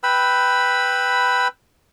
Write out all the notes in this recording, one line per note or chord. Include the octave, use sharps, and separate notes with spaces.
B4 G5 B5 E6